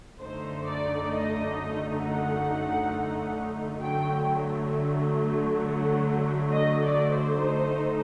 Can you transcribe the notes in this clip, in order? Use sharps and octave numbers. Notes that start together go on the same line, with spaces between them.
F#2 D3 A3 D#4 C5
D5
D#5
F#5
D3 F#3 A3 G5
F#5
D#5
D5
C5
D3 A3 D#4